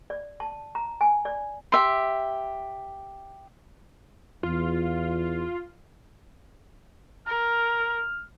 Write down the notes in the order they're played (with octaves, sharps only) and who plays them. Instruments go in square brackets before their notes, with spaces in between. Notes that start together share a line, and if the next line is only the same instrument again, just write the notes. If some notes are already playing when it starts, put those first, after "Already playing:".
[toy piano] D5
A5
A#5
G#5
D5
[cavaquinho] G4 E5 C6
[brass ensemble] E2 [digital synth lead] F4
[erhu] A#4 [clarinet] F6